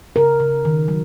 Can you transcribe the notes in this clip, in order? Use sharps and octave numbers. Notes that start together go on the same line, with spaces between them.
C#3 A#4
C#3
D#3
F#3